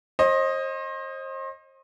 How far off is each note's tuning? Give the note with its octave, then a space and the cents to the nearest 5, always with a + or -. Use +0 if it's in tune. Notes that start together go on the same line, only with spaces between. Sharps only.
C5 +35 D#5 +0